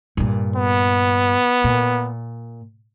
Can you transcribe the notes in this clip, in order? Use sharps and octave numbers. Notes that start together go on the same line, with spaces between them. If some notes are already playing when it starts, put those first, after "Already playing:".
G2 A#2
B3
A#2